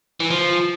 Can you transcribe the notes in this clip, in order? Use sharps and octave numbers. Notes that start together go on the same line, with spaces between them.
E3
F3